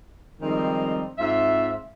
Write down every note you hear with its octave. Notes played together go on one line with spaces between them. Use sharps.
D#3 F3 G3 G#3 C4 D#4
G#2 C4 F4 E5